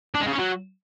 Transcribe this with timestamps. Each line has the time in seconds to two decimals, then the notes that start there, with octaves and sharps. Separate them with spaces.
0.15 D4
0.21 G#3
0.27 C#3
0.33 C#4
0.39 F#3